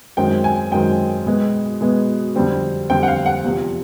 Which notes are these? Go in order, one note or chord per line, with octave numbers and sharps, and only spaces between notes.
F#2 D#3 G#3 C4 G5
G#5
F#2 D#3 G#3 C4 G5
B2 G#3 B3
B2 G#3 B3
F2 D3 G3 C4
F2 D3 G3 C4 G5
F#5
F5
F#5
E2 C3 F3